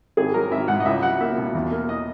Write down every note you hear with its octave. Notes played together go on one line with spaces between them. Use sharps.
G#1 G#4
F#3 A#4
G#1 E5
G#2 F#5
D#5
C#2 E5
F#3 F#5
A#3 E5
B2
E2
A#3
D#5